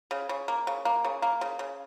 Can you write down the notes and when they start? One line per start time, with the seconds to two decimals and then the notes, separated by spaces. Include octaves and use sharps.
0.11 C#3
0.29 C#3
0.48 A#3
0.67 C#3
0.85 A#3
1.04 C#3
1.22 A#3
1.41 C#3
1.59 C#3